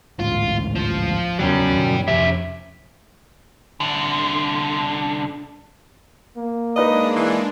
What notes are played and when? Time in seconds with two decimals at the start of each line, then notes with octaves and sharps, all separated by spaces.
0.20 A1 D2 G#2 F4
0.75 F3 F4
1.39 D1 E2 C#3 F#3 C#4 D5 G5
1.75 G2 B2 D3
2.08 F2 C3 F3 C#4 G4 E5
3.80 C2 D3
6.37 A#3
6.76 G#3 D4 D#4 B4 D5 D#5
7.16 E3